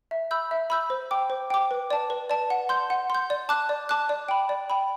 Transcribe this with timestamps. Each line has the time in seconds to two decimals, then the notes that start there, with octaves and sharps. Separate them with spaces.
0.11 E5
0.31 B5 E6 G6
0.51 E5
0.70 B5 E6 G6
0.90 C5
1.11 G5 D6
1.30 C5
1.50 G5 D6
1.71 B4
1.90 D5 A5
2.10 B4
2.30 D5 A5
2.50 F#5
2.69 C6 G6
2.90 F#5
3.10 C6 G6
3.30 D5
3.49 A5 D6 F#6
3.69 D5
3.89 A5 D6 F#6
4.09 D5
4.29 G5 B5
4.49 D5
4.70 G5 B5